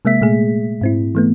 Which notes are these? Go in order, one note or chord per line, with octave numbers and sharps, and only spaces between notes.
C3 G#3 A#3 E5 B6
A#2 G#3 A3 G#4
G#2 C4 E4
E3 A3 B3